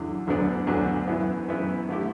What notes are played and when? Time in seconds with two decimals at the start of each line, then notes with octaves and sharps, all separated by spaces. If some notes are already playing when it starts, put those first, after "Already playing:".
Already playing: E2 D3 F#3
0.27 D2 D3 F#3 B3 D4
0.67 D2 D3 F#3 B3 D4
1.07 F#2 E3 B3 E4
1.48 F#2 E3 B3 E4
1.89 D3 A3 E4 G4